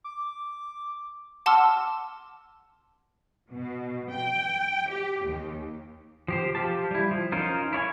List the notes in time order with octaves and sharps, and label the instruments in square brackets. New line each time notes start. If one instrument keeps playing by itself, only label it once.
[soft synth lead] D6
[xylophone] F#5 A5 C6 D6 E6 F6
[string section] B2
G5
G4
D#2
[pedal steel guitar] F3 G4 C5
F3 F4 G4 A5
G3 E4
F3
C#4 D#4 F4 A#4 C5
E4 C#5 D5 G#5